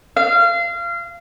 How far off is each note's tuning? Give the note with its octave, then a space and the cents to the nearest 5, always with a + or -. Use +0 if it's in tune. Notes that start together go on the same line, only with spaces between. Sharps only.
F5 -25